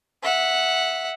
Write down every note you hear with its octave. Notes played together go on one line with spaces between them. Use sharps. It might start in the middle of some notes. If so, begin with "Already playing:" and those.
E5 F#5